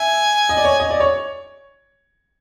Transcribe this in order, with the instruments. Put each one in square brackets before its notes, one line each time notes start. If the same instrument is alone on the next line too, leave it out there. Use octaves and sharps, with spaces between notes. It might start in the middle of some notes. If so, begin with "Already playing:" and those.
Already playing: [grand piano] E5 [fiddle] G#5
[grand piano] D#5
D5
C#5
D#5
D5
C#5